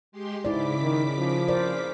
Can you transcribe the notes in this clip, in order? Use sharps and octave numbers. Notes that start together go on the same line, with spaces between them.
G#3 G4 C6
G#2 C#3 E4 D5 D6 B6
D#3
F3
A#4 C5 D5